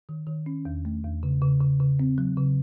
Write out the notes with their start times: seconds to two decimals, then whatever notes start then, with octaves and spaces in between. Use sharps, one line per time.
0.09 D#3
0.27 D#3
0.46 C#4
0.65 E2
0.85 A3
1.04 E2
1.23 C#3
1.42 C#3
1.61 C#3
1.80 C#3
2.00 C4
2.18 F#3
2.37 C#3